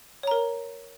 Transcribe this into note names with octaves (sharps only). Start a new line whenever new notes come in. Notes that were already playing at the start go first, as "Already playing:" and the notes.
A#4 C#5 A#5